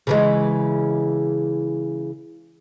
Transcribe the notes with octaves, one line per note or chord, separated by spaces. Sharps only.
C#3 E3 G#3